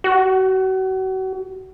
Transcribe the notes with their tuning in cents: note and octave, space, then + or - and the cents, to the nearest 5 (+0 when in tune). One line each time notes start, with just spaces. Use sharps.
F#4 +35